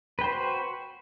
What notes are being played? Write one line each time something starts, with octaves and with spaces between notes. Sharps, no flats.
F#4 B4 C5 G5